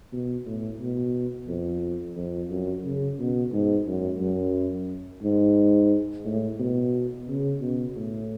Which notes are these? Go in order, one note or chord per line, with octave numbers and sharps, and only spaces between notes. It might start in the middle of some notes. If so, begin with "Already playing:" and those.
B2
A2
B2
F2
F2
F#2
C#3
B2
G#2
F#2
F#2
G#2
A2
B2
C#3
B2
A2